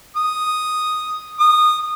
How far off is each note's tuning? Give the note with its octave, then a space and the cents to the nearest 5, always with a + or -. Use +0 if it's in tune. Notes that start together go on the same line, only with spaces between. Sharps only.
D#6 +0
D#6 -20